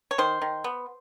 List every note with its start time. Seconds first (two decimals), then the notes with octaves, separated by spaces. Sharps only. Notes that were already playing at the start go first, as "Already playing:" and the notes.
0.11 C#5
0.18 D#3 C5
0.42 D#3
0.64 B3